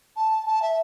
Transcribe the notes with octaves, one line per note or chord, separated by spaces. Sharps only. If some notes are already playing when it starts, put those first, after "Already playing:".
A5
A5
E5